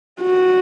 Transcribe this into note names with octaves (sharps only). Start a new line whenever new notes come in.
F#4